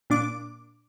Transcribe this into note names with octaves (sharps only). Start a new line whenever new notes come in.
A#2 D4 D6